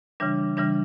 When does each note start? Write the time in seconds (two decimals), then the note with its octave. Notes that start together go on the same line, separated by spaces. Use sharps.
0.20 C#3 E3 G3 D4
0.57 C#3 E3 G3 D4